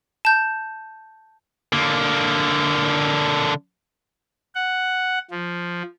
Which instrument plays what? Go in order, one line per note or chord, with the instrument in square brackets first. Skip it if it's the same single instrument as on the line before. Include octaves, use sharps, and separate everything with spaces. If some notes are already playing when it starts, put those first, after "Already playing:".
[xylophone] A5 G6
[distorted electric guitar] D3 A#3
[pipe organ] F#5
F3